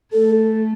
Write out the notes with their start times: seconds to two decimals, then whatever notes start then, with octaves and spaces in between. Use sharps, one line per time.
0.13 A3 A4